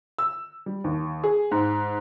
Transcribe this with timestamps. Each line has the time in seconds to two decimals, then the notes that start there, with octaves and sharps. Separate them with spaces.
0.19 E6
0.66 G3
0.84 D#2
1.24 G#4
1.51 G#2